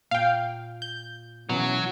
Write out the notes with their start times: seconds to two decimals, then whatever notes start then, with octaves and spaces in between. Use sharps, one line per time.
0.11 A#2 F5 G5
0.82 G6
1.49 B2 E3 F#3 C#4